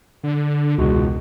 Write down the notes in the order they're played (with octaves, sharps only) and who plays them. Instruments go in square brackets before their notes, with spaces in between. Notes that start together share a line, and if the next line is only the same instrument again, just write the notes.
[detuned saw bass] D3
[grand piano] E1 G#3 F#4 [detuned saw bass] C#2